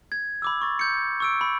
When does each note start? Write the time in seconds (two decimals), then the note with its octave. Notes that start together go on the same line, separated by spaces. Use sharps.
0.12 G#6
0.42 B5 D6 E6
0.62 C#6 A6
0.79 G6 C#7
1.20 C#6 E6 D7
1.41 B5